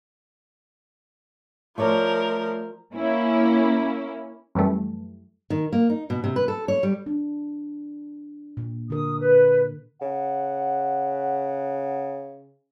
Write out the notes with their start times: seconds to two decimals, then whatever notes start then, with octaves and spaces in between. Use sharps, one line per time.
1.78 F3 A3 A#4 C#5 D5
2.95 A#3 C#4 E4
4.55 F#2 E3 G3 A3
5.50 D#3
5.73 A#3
5.90 D#4
6.10 B2
6.24 C3
6.36 B4
6.48 A4
6.68 C#5
6.83 G3
7.06 D4
8.57 A#2
8.90 D3 A#4 D#6
9.19 B4
10.02 C#3 F#5